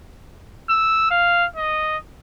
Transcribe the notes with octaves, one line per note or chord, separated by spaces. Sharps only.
E6
F5
D#5